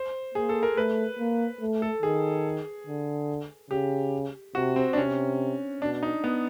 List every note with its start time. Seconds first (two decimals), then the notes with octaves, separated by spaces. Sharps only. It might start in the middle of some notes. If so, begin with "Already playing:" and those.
Already playing: C5
0.35 A#3 G#4
0.49 A4
0.63 A#4
0.77 A3 B4
1.19 A#3
1.61 A3
1.82 A4
2.02 D#3 G#4
2.87 D3
3.71 C#3 G4
4.55 C3 F#4
4.76 C4
4.93 D4
4.98 C3 C#4
5.81 B2 D4
6.03 D#4
6.24 B3